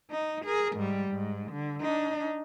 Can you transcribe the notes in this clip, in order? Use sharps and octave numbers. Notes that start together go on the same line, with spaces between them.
D#4
G#4 A#4
G#2 G3
G#2
D3
D4 D#4